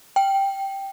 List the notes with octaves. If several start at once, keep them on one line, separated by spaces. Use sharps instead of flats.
G5